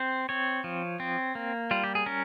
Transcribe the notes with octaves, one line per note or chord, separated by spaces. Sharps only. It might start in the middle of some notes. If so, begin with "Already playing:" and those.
Already playing: C4 C5
C4 C#5
F3
C4
A#3
G3 F4
G4
G#4
C#4 A#4